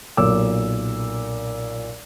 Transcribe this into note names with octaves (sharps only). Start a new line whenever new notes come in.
B1 A#2 D6 E6